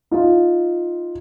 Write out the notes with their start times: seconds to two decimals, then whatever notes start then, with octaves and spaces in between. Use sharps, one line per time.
0.11 D#4 F4